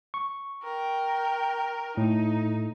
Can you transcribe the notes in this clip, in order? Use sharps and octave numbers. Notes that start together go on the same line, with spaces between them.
C#6
A#4 G5
A2 D#4